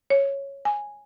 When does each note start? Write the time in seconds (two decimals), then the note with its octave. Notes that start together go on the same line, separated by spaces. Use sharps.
0.10 C#5
0.65 G#5